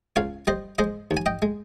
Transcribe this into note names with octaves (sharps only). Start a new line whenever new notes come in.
C#2 C#5 F5
G3 C5 D#5
G#3 C5 D#5
D#2
G#5
D#5 G5
G#3